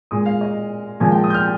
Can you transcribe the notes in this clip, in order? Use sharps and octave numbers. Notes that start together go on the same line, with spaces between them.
A#2 G#3 D#6
F5
D#5
A#2 F3 G#3 G#5
G5
D#6
G6
F6